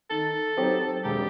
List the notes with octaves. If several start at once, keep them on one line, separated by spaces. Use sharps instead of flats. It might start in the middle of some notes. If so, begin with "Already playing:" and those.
D#3 A4
F#3 C4 D#4 G4
E1 G4